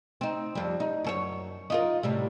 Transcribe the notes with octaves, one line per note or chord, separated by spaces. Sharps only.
C4 D#4
F2 G3
D#4
F#2 A4 C#5
D#4 F4 A#4
A2 C3 G3